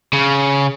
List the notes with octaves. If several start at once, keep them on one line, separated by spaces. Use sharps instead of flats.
C#3